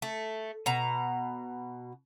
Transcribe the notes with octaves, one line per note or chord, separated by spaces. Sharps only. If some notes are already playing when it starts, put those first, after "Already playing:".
A3
B2 A#5